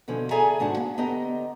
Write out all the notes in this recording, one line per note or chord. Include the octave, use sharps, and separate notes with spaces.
B2 D3 F3 C#4
G#4 A4 D5 E5 G#5 A#5
D#2 G#2 D4 F#4 A5
A#3
D3 B3 G4 D#5 A#5